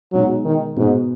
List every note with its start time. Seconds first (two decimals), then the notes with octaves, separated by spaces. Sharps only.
0.13 B2 F#3 G#3 D#4
0.45 D#3
0.77 G#2 B2 B3 F#4